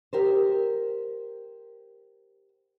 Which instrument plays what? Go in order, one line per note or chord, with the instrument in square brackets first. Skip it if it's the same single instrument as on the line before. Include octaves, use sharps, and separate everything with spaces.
[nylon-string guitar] G4 A#4 C5